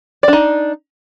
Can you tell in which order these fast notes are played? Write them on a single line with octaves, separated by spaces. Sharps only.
D5 D4 D#4